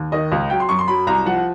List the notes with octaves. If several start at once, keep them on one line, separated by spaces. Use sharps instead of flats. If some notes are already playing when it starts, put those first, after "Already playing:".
Already playing: D#2
D#3 D#5
C#2
F#3 G5
C6
F#2 C#6
C6
F#3 B5
C2 A#5
F3 F#5